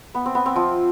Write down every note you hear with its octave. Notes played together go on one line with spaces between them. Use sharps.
B3
C4
B3
C4
F3 F4